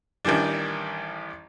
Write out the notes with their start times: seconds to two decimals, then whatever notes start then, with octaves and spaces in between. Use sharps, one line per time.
0.25 A1 D#3 E3 G3 D4